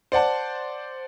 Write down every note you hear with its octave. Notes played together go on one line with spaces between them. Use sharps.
C5 D5 F#5 A5